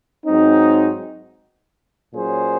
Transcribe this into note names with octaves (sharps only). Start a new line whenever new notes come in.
G#2 F#3 C4 D#4
A#2 F#3 C#4 G#4 C5